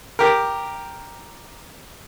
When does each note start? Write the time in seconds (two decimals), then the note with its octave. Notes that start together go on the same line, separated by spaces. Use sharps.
0.19 G4 A#4